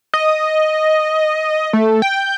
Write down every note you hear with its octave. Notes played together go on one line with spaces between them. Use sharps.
D#5
A3
G5